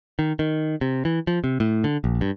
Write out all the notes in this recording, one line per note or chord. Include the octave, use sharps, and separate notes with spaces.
D#3
D#3
C3
E3
F3
C3
A2
D3
A#1
G2